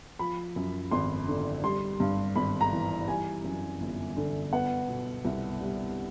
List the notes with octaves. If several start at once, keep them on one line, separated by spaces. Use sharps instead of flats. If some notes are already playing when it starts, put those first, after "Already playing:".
F3 B5
F#2
G#1 C6
D3
G3 C6
G2
G#1 B5
A#5
E3
G3 G#5
F#2
G1
D3
B3 F#5
B2
C2
G3